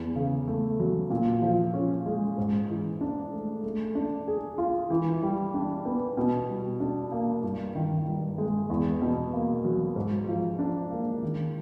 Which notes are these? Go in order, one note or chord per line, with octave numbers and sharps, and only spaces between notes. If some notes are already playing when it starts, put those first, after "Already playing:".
Already playing: E2
C#3
A3
F#3
A#2
F3
C#4
G#3
G#2
E3
D4
A3
A3
D4
G#4
F4
E3
G3
D4
B3
B2
G3
D4
A#3
G2
D#3
G2
G#3
E2
B2
A#3
F#3
G#2
F3
D4
A#3
D#3